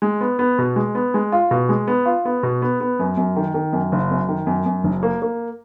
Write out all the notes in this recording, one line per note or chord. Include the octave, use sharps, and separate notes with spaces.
G#3
B3
B3
B2
G#3
B3
G#3
F4
B2
G#3
B3
F4
B3
B2
B3
B3
F#2
F#2
D#3
D#3
F#2
F#1
F#2
D#3
F#2
F#2
F#1
A#3
A#3